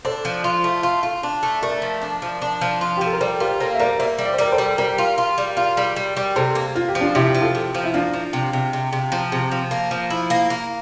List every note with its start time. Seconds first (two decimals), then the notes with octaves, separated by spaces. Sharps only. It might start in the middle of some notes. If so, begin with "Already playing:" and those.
0.05 D4 A4 C5
0.25 F3
0.44 F4
0.64 A3
0.83 F4
1.03 F4
1.23 D4
1.43 A3
1.62 A3 A#4 D5
1.82 F3
2.02 D4
2.22 F3
2.42 D4
2.61 F3
2.81 F4
2.97 G4
3.01 F3 A4
3.13 A#4
3.20 G3 A4 C5
3.40 F4 G4 A#4
3.60 A#3 A4 C5
3.75 E5
3.79 G3 A#4 D5
3.99 A#3 C5 E5
4.19 G3
4.25 D5
4.34 C5
4.38 G3 A#4 D5
4.52 A4 C5
4.58 G3
4.78 G3 G4 A#4
4.98 F4
5.18 F4
5.38 G3
5.57 F4
5.77 G3
5.96 G3
6.17 G3
6.36 C3 A4 C5
6.55 A#3
6.75 A#3 F4
6.88 G4
6.95 F3
7.01 D4 F4
7.14 C3 E4 G4
7.34 F3
7.41 F4 A4
7.55 C3
7.75 F3
7.84 E4
7.94 A#3 D4 F4
8.13 F3
8.33 C3
8.53 C3
8.73 C3
8.93 C3
9.12 F3
9.32 C3
9.51 F3
9.71 A#3
9.91 F3
10.11 E4
10.30 A#3
10.50 A#3